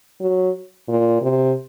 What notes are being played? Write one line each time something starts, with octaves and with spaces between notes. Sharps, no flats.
F#3
A#2
C3